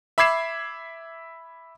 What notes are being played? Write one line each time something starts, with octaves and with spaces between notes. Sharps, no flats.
E5 B5 D6 G#6 C7 E7